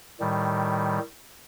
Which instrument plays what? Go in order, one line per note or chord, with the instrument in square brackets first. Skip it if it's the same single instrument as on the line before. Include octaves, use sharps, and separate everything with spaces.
[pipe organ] A2 D#3 G3